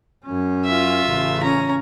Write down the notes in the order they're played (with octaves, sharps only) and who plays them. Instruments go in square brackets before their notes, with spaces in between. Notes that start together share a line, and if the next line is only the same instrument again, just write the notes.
[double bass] F#2 C#4
[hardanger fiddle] F4 E5
[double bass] A1 C#3
[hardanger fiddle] C#4 A#5